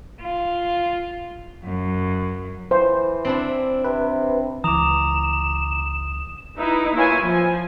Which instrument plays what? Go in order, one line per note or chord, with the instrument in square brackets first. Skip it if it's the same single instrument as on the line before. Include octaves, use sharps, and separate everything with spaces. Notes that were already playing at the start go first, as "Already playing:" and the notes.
[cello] F4
F#2
[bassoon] E3 [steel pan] C5
[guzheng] C4 D4 E4
[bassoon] C3 [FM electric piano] B4
[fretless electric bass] C#2 E3 [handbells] A#5 D6 [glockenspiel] D#6 F7 [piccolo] E7
[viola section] D#4 E4 B4
A#3 E4 F4 B4 C#5 G#5
F3 G#5